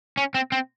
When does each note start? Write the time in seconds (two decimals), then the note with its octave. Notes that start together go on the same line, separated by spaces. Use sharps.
0.17 C#4
0.34 C4
0.52 C4